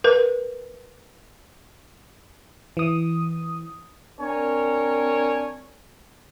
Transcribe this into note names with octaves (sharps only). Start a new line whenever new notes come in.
A#4 B4
E3 D#6
C4 D4 A#4 C#5 G#5